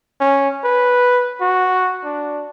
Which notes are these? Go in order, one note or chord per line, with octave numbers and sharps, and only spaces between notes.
C#4
B4
F#4
D4